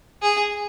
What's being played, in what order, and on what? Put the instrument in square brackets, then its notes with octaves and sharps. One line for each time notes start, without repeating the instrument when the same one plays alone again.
[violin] G#4